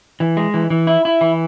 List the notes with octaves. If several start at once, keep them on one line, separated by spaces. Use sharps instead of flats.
E3
G#3
E3
E3
E4
E4
E3